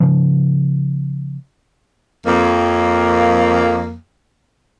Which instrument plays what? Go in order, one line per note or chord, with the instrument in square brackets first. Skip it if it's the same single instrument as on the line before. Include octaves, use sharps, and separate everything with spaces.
[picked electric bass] C#3 F3
[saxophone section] F2 A#3